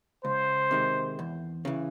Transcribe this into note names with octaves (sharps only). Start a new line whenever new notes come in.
C#2 C5
C3 D#3 G#3
E2
C#3 E3